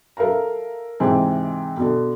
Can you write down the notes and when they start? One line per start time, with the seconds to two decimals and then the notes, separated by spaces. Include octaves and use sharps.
0.17 A4 A#4 E5 F5 A#5
1.00 G#2 C3 E3 C4 D#4
1.77 B2 D3